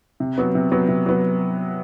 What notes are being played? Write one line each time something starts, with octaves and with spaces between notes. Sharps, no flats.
C3
F#3 B3
C3
F#3 B3
C3
F#3 B3